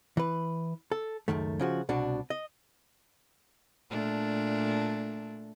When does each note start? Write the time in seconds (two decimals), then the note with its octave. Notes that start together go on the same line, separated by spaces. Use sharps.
0.17 E3 B4
0.92 A4
1.28 C#2 F#2 D#3 A3
1.59 C#3 F3 F#4
1.89 C2 B2 D4 F#4
2.30 D#5
3.90 A#2 A3 D4